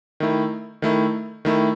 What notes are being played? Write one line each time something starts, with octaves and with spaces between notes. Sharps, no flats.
D#3 A3 E4
D#3 A3 E4
D#3 A3 E4